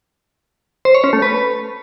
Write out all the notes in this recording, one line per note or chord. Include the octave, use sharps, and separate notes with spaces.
C5
C#5
C#4
A3
B4